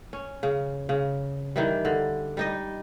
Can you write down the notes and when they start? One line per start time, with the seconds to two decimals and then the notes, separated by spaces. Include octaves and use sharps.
0.13 C#4
0.43 C#3
0.89 C#3
1.56 D#3 E3 G3
1.85 D3
2.37 G3 D#4 D#5